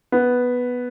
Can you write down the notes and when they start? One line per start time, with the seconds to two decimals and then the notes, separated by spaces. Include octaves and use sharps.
0.12 B3